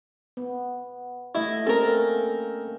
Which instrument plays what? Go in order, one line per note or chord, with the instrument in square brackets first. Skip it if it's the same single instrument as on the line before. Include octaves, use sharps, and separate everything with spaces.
[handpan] B3
[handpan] A3 D#5 [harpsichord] E4
[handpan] A#3 C4 C#4 [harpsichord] A4 A#4